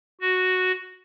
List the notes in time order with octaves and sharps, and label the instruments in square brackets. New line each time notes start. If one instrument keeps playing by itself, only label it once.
[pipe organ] F#4